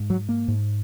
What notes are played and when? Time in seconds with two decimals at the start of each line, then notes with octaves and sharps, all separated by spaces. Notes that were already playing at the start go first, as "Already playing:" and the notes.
Already playing: G#2
0.10 F#3
0.29 A#3
0.48 G#2